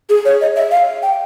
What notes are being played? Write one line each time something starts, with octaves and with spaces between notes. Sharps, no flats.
G#4
C#5
D#5
E5
F5
G5